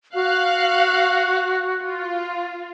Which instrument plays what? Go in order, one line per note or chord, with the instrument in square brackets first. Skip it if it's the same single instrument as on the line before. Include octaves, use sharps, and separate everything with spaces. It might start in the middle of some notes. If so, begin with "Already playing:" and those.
[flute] F#4 [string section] F5 F#6
[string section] F4